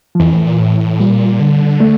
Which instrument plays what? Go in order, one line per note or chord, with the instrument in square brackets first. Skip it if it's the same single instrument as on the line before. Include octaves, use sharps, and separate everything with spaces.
[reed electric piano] F3
[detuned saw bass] F2 [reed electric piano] E3
[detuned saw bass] A2
A#2
A2
[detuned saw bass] A#2 [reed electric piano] G3
[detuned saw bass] D3
[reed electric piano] A3